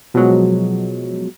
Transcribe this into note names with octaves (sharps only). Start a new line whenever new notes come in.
B2 F3 F#3 G#3